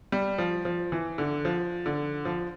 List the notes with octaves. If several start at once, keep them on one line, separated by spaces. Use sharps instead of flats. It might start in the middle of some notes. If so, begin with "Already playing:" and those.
G3
F3
F3
E3
D3
F3
D3
F3